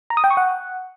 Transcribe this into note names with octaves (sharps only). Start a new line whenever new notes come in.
A#5
D#6
G5
C#6
F#5